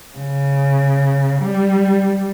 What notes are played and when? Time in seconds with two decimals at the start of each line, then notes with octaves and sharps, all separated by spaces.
0.17 C#3
1.43 G3